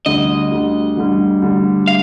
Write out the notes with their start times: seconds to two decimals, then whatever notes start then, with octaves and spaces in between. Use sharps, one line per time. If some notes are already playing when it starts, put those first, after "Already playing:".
0.06 D2 D3 G3 D#5
0.51 D2 D3 G3
0.97 D2 D3 G3
1.42 D2 D3 G3
1.88 F5